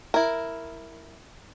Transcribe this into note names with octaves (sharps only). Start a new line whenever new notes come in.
E4 A#4